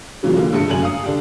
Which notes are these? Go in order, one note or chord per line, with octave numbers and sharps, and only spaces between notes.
A#2 C#3 E3 F#3
D3 G3 A#3
A#1 G2 D3 A3 C#7
F#2 D3 G#5 F#7
F5 D#6
D3 D4 G4